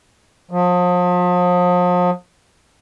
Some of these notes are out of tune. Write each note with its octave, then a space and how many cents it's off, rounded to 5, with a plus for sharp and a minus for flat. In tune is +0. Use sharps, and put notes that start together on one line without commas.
F3 +35